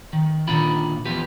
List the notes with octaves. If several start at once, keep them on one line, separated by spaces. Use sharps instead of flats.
D#3
A#2 D3 D#3 F4 B5
E2 F3 G4 B4